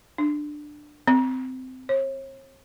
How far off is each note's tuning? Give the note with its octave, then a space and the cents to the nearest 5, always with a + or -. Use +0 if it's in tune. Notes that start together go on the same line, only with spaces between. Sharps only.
D4 +15
C4 -20
C#5 -45